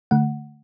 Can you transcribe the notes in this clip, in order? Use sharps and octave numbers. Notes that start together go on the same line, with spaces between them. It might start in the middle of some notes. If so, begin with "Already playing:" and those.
D3 A3 F#5